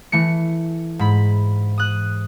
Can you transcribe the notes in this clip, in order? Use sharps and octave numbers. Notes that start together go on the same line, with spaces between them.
E3 A3 C#7
G#2 B5
D#6 F#6